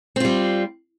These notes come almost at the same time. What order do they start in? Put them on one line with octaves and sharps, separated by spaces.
C4 F4 G3